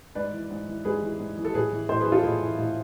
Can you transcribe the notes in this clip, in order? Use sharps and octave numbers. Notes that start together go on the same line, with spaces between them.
G#2 B4 D5
E3
G#2
E3
G#2 G#4 B4
E3
G#2
E3
A4
A2 G#4 B4
E3
A2 A4 C5
G#4 B4
E3
F4 A4
A2 E4 G#4
E3
A2